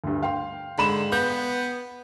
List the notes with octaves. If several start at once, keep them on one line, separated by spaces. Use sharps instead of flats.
D2 G2
F5 G5 C6
G#2 D3 B5 E7
B3 G6